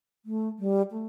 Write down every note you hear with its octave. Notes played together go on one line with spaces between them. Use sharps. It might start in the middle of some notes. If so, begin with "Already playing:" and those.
A3
G3
A3